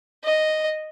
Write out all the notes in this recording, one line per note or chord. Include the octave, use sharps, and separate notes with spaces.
D#5